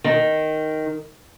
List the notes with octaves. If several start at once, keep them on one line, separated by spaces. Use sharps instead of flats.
D#3